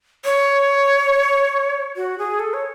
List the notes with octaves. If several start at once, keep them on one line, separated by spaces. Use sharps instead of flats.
C#5
F#4
G#4
A4
C#5